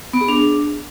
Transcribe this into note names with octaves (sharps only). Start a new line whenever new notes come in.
B3
G#4
D4